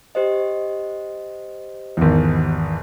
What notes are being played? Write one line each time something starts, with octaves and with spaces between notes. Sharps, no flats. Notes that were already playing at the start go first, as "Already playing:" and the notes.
G4 C5 D#5
G#1 E2